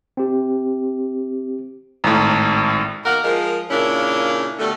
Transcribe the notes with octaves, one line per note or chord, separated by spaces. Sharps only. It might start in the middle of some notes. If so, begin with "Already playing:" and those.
C4 G4
G#1 A2 A5 A#5
B2 D#3 A#3 A#4 F#5
F3 G#3 A#4
A#2 C#3 C#4 D4 E4 A#4
B2 D3 G3 A3